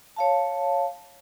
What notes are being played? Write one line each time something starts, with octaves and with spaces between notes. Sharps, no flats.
C#5 F5 A5